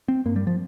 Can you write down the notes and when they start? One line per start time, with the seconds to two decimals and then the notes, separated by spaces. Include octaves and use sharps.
0.08 C4
0.26 G2 A#3
0.36 G3
0.47 F3